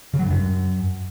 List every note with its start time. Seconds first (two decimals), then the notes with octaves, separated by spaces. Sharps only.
0.14 C#3
0.19 F#3
0.25 G2
0.30 F#2